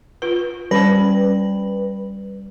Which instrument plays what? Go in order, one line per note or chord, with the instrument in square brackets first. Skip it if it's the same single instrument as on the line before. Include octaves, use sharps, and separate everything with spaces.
[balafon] F4 B4
[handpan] G3 [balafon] C#4 C5 [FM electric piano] B4